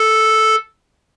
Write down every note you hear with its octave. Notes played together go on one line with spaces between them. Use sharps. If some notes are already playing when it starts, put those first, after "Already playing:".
Already playing: A4